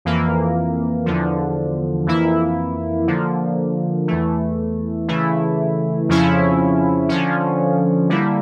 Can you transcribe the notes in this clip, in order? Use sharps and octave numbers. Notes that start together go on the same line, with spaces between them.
F2 E3 A#3
E2 D3 F3
F2 E3 A#3 E4
D3 F3 A#3
E2 E3 A3
C#3 E3 A3 E4
F2 C#3 F3 C#4 E4
D3 F3 C#4
D3 G3 A#3 E4